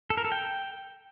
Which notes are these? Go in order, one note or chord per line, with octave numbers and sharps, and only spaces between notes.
A4
A#4
A4
G5